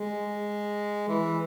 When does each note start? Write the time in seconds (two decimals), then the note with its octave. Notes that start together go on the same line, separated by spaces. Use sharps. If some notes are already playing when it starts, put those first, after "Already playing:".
Already playing: G#3
1.08 E3